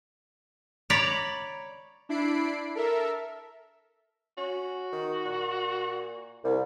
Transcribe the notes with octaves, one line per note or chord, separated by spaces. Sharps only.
C#5 D5 A#5 B5
D4 E4 B5 C7 D7
A4 A#4 E5
C#4 F#4
D#3
A#2
C2 G3